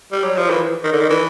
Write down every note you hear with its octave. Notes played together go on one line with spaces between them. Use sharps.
G3
F#3
F3
E3
D#3
D3
D#3
E3